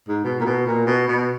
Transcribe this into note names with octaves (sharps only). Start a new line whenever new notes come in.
G#2
B2
A#2
B2
A#2
B2
B2